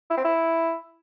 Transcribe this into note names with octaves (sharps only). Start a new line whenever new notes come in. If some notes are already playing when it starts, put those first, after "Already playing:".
E4
C4
E4